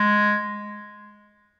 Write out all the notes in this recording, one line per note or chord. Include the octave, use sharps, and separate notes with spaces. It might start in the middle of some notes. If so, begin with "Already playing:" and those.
Already playing: G#3